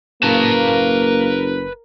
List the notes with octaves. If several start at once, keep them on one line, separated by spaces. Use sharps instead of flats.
F#1 A#3 A#4 B4 A5